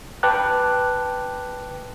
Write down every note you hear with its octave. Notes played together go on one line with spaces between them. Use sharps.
B4 G5 A5 D6 F#6